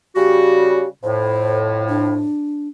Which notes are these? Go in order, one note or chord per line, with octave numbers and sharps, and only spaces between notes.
C#3 G3 F#4 G4
F2 A2 C5
D4